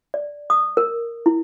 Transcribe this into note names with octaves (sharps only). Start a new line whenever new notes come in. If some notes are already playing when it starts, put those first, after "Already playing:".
D5
D#6
A#4
E4